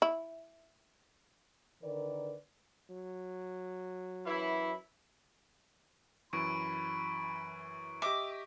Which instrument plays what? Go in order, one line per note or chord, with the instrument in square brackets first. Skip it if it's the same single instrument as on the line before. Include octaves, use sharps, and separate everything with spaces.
[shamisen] E4
[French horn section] D3 D#3 A#4 B4 D5
[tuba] F#3
[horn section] F#2 E3 E4
[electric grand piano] F#2 E3 [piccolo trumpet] B5 [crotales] C#6 D7
[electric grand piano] G4 D#5 E5 [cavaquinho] D6